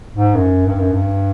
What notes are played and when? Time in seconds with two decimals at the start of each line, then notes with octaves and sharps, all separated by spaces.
0.15 G#2
0.35 F#2
0.66 G2
0.79 F#2
0.92 G2